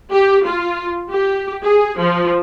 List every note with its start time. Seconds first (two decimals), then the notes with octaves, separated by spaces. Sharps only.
0.10 G4
0.45 F4
1.09 G4
1.63 G#4
1.99 F3